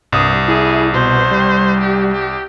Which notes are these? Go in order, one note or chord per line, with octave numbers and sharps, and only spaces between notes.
C2 G2 D#6
E4 G#4
B2 C5
G3
G4
G4